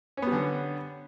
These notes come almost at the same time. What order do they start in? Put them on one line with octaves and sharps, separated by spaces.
C#4 B3 G3 D3